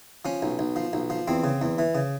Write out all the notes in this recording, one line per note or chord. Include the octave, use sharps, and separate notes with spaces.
F3 C#4
B1
B1
F3
B1
F3
E2 C4
C#3
E2
E3
C#3